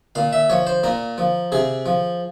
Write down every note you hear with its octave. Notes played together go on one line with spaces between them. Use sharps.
A#2 F5
E5
F3 C#5
C5
A#2 A#4
F3
C3 G#4
F3